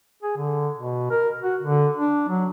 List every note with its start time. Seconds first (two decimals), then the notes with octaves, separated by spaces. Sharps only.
0.23 G#4
0.37 D3
0.76 B2
1.11 A#4
1.43 F#4
1.61 D3
1.96 D4
2.28 F#3